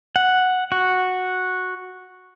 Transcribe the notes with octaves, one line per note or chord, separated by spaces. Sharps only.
F#5
F#4